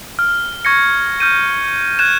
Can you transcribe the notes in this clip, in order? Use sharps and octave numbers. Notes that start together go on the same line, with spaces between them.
F6
C#6 G#6 A#6 C#7
F6 G6 D#7
F#6 G#6 E7